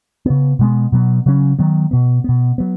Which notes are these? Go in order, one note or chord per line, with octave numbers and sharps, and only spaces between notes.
C#3 B3
B2 G#3 B3
B2 F#3 B3
C#3 F#3 C#4
D#3 F#3 B3
B2 B3
B2 B3
F#3 B3